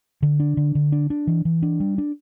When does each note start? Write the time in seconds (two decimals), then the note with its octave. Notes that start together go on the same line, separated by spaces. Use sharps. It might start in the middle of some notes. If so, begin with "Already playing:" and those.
0.22 D3
0.40 D4
0.57 D3
0.75 D3
0.92 D4
1.10 D4
1.27 E3
1.45 E3
1.62 D4
1.80 G3
1.98 D4